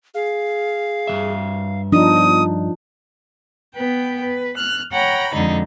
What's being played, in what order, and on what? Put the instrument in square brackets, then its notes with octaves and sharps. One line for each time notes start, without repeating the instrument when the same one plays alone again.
[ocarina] G#4 [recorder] F5
[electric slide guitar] G2 E3 E5
[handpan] F3 D4 D#4 [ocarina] B3 [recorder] D#6
[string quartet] B3 B4 G5
B4
F6 F#6
C#5 F#5 G5 A#5 B5
F2 D3 G#3 D#4